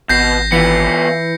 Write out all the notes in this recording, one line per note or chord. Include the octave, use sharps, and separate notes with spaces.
G#1 B2 G6 A#6 C7
E3 B3 F4 C#7